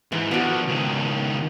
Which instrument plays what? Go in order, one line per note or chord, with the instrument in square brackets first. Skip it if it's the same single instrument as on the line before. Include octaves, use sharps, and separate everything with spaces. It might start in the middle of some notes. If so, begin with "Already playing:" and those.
[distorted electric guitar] G#2 [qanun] E3
[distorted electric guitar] F3 D4 [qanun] B3 F#4
[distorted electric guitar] C#2 D#3